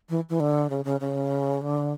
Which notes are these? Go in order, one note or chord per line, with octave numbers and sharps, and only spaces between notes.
E3
E3
D3
C#3
C#3
C#3
D3